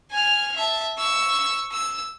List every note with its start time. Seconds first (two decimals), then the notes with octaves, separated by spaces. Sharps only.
0.11 G#5 F6
0.56 E5 A5
0.98 C#6 E6
1.71 E6